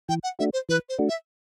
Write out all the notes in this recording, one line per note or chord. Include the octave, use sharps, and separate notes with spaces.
E3 G5
F#5
A3 D4 F#4 E5
C5
E3 B4
C5
A3 D4 F#4
E5